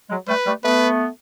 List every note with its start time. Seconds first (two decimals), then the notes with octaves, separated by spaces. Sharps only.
0.10 F#3 G#3
0.27 G3 A3 B4
0.46 G3 A3
0.63 A3 B3 B4